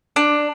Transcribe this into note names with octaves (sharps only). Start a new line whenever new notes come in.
D4